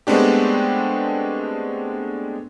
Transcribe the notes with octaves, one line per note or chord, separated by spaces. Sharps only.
G#3 A3 B3 C4 D4 G4